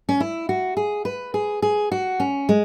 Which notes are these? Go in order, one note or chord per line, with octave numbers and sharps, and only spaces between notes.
C#4
E4
F#4
G#4
B4
G#4
G#4
F#4
C#4
G#3